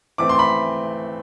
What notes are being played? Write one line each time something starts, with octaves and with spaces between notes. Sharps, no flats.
E3 A3 C4 D6
C6
B5